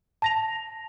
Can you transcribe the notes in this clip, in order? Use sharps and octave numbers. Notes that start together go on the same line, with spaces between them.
A5 A#6 F7